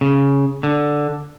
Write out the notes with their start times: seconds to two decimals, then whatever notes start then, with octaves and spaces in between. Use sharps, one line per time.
0.01 C#3
0.63 D3